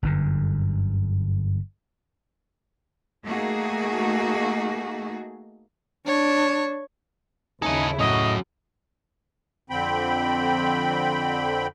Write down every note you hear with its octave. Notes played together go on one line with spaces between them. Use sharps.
G1 F#2 D3
A3 A#3 D#4 F#4 G#4
D4 C#5
D#2 C#3 D#4 E4 A4 D#5 G#5
A2 F#3 C#4 D#5
F2 D3 C4 G5 B5